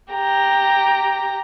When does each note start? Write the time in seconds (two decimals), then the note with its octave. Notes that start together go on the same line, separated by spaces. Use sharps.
0.14 G4 A#5